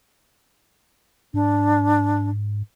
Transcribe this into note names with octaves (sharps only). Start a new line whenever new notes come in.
G#2 D4